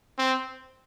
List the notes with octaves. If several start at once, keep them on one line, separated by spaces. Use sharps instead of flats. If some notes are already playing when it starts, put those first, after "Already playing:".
C4